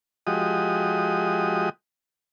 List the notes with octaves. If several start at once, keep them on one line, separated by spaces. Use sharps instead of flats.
F3 G#3 F#4 G4 D#5 D#6